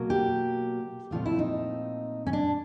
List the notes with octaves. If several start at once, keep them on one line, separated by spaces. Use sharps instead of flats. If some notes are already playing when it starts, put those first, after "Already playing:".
Already playing: B2 F#3 A#3
G4
A#2 F3 A3 C4 F4
E4
D#4
C#4
D4